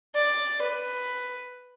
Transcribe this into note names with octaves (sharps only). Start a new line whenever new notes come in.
D5
B4